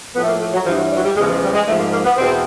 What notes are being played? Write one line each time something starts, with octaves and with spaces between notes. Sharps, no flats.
A2 F3 B3
A3
A#3
A3
F#3
G2 E3 F3
F#3
G3
F#3
G3
E2 C#3 F3 G#3
G#3
G3
G#3
G#2 F3 A3
A#3
A#3
B3
E2 B2 C4